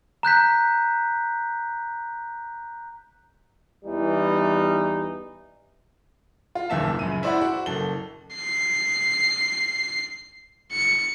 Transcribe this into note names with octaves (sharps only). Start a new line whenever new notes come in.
A#5 F#6 G6 B6
E2 E3 G3 D#4
F4
F#1 D#2 A#2 E5 A5
C#2 F#2 D#7
E4 C5 D5 E5 F#5
F#4
F#1 A4 G7
C7
C#7